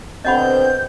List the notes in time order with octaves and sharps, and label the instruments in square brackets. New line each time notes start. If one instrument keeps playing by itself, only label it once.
[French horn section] B2 D3 C4 [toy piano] D#5 F#5 B5 [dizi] G6